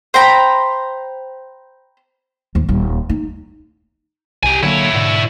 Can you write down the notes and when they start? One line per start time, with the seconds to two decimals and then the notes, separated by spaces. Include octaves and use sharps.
0.14 C5 G5 A#5 B5
2.55 D#2 F3
2.69 D#1 G3
3.09 D#4
4.43 C2 G4 G#5
4.63 D3 F#3 A#3 E4 C#5
4.93 G#2 B2 D3